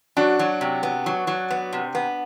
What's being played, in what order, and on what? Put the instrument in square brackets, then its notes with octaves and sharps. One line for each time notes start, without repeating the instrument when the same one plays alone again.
[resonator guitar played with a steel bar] F#3 [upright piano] D4 F#4
[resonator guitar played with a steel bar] F#3
C3
B3
F#3
F#3
B3
C3
B3